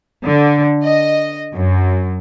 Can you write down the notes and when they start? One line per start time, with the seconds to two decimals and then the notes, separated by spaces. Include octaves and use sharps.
0.25 D3
0.83 D#5
1.56 F#2